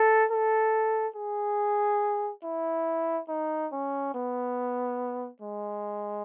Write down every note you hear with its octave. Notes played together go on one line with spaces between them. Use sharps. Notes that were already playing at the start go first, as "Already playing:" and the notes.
Already playing: A4
A4
G#4
E4
D#4
C#4
B3
G#3